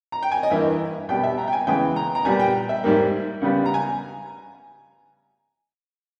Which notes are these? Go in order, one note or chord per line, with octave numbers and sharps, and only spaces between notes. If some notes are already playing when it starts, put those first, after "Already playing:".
A#5
G5
G#5
D#5
G2 E3 A#3 E5
B2 G3 B3 G5
E5
A#5
G5
G#5
C#3 E3 G#3 B3 G5
A#5
A#5
A#2 G3 B3 G#5
G5
E5
G#2 G3 A#3
C#3 G3 B3
A#5
G#5